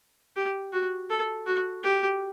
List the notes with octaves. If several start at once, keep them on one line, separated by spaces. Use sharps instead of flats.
G4
F#4
A4
F#4
G4